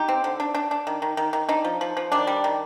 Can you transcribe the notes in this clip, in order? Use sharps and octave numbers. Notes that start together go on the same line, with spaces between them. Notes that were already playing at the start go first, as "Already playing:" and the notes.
Already playing: D#4 G4
C4
D3
D4
D4
D4
D#3
D#3
D#3
D#3
D4 D#4
F3
F3
F3
D#3 D4
G3
D#3